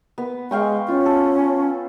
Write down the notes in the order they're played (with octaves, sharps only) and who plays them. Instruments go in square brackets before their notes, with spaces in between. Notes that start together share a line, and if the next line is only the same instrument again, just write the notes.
[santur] B3
[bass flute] G#3 [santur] F5 G5 C#6
[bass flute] C#4 [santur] F4
[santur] A4